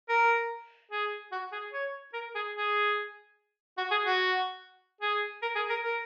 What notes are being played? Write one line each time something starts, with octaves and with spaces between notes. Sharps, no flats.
A#4
G#4
F#4
G#4
C#5
A#4
G#4
G#4
F#4
G#4
F#4
G#4
A#4
G#4
A#4
A#4